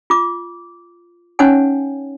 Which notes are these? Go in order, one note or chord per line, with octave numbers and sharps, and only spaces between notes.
F4 D6
C#4 D#4 C#5 F#5 G#5